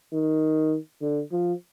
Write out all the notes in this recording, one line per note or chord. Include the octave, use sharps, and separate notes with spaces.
D#3
D3
F3